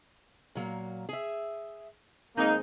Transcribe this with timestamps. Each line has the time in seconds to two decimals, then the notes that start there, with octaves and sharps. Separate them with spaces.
0.55 A#2 F#3 A#3
1.09 G#4 E5
2.37 D#2 G#3 A#3 C4 D#4